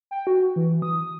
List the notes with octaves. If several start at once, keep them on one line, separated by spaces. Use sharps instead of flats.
G5
F#4
E3
D#6